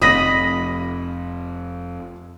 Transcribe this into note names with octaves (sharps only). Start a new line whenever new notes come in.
F1 A#2 C4 D#5 B5 D#6 A#6 D#7